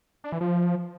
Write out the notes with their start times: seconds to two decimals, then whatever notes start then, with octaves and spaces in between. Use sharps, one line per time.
0.24 D4
0.32 E3
0.41 F3